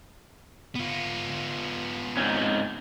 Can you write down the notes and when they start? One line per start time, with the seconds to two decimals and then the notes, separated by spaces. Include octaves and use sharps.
0.75 B3 F4
2.17 G#2 C4 C#4